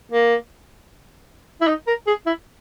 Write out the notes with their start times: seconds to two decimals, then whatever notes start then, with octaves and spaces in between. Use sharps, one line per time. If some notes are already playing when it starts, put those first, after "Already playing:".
0.11 A#3
1.61 E4
1.67 D#4
1.87 A#4
2.07 G#4
2.26 E4